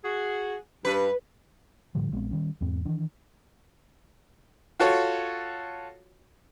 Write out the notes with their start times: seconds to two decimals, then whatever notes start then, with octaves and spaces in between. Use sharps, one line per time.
0.03 F#4 G#4
0.85 G2 B4
1.95 A2 D3 F3 G3
2.12 A#1 G#3 B3 C4
2.31 D#3 G3 C#4
2.61 E2 G#2 C4
2.85 D#3 E3 D4
4.80 F4 F#4 A4 C#5